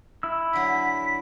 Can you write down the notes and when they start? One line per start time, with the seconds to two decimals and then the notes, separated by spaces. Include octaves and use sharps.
0.23 E4 E6
0.53 D3 F#3 F#4 B6